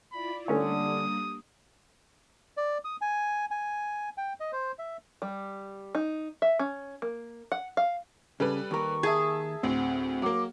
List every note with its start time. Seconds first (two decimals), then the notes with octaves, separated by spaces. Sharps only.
0.12 E4 F4 D5 B5
0.48 D3 G3 A3 A#3 C#4 D4 C#5 D#6
2.57 D5
2.85 D#6
3.01 G#5
3.51 G#5
4.17 G5
4.40 D#5
4.52 C5
4.79 E5
5.22 G3
5.95 D#4
6.42 E5
6.59 C#4
7.02 A#3
7.52 F#5
7.77 F5
8.40 C#3 G3 A4 B4
8.71 D#2 A#4 C#6
9.03 G#4 E5 A5 G#6
9.63 D2 A2 C4 F#5
10.22 F#3 A#3 D6